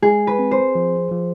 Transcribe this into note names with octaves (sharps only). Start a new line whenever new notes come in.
G#3 G#4
B4
C4
C5
F3
F3